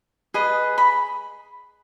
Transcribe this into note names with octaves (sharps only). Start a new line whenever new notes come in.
G#4 B4 D#5
B5